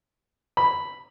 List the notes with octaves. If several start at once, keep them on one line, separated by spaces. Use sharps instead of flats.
B5